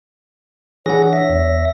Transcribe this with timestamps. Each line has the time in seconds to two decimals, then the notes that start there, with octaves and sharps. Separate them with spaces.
0.86 E3 D4 G#4 C#5 F#5 A#6
1.13 E5 A#6
1.30 E2